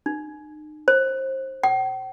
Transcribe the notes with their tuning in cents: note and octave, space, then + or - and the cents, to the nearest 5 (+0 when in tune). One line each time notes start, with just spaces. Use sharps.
D#4 -40
C5 +25
G5 -45